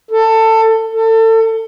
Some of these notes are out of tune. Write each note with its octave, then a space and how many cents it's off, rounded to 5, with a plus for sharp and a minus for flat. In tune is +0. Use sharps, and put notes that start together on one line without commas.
A4 +20
A4 +30